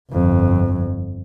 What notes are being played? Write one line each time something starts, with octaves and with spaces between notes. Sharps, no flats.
G1 F2